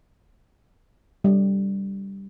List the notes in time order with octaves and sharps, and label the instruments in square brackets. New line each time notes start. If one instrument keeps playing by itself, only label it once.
[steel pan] G3